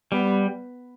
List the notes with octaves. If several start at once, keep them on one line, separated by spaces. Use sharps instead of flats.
G3 B3